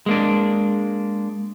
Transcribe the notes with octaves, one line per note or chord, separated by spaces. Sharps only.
G#3 A#3 D4